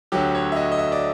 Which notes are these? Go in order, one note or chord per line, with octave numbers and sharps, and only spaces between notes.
D2 D3 F#3 G4
C#5
E5
D#5
D#5
E5
D5